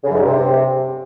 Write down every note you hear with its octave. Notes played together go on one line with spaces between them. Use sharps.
C#3
F#2
G#2
G2
C3